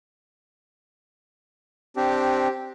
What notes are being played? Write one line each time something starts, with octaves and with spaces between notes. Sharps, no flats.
C4 D4 G4